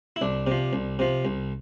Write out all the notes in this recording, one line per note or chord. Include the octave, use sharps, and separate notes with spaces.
E4
C2 D4
C3 F3
C2
C3 F3
C2